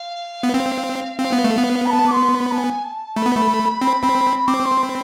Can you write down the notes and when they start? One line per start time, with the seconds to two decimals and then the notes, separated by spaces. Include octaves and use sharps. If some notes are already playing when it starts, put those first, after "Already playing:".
Already playing: F5
0.43 B3
0.54 C4
1.19 C4 F5
1.33 B3
1.44 A3
1.58 B3
1.85 B5
1.89 A5
2.07 D6
2.12 C6
2.29 C6
2.34 B5
2.51 A5
2.55 G#5
2.83 A5
3.16 A3 B5
3.26 B3
3.36 A3
3.81 C4
4.03 C4
4.47 C4 D6
4.64 C6
4.80 B5